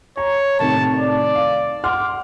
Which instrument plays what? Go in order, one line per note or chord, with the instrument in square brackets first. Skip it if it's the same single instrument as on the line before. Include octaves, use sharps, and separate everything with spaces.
[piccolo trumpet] C#5 [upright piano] A#5
[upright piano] A2 C3 D#3 [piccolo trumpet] A5
[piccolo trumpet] D5
[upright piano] F5
[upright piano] F#5 C6 F6 [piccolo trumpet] D6